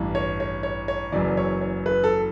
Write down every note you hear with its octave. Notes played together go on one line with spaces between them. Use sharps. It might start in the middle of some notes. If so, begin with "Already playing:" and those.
Already playing: A1 G2 E3
C#5
C#5
C#5
C#5
F#1 F#2 E3 D5
C#5
C#5
B4
A4